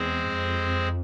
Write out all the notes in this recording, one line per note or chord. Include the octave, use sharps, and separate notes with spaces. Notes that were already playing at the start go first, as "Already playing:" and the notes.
Already playing: E2 G#3 C4 G#4 C5
F2